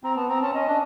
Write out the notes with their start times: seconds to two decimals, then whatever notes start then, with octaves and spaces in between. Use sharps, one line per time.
0.04 C4 A#5
0.16 B3 A5
0.28 C4 A#5
0.42 C#4 A5
0.54 C#4 D#5
0.67 D4